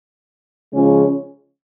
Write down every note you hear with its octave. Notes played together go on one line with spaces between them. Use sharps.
C#3 F3 G#3 C#4